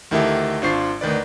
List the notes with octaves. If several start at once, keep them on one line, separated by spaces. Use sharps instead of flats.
D2 D#3 E4 G4 A4 G5
G#1 D4 F4 C5 C#6 C7
D2 D#3 B4 D5